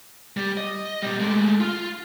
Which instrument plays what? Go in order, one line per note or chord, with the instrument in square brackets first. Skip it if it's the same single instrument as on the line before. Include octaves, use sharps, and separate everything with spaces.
[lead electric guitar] G3
D#5
A#2 G3
G#3 A3
F4